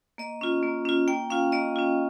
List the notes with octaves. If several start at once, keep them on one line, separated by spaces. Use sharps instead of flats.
A#3 D#5
C#4 F4
A#3
C#4 F4
A#3 G5
C#4 F4 F5
A#3 D#5
C#4 F4